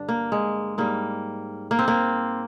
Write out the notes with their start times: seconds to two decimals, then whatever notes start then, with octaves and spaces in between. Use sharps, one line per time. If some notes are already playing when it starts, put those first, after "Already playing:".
Already playing: G2 D3 D4
0.09 A#3
0.32 G#3
0.78 G#2 G3 A#3
1.71 A#3
1.79 C4
1.88 A#3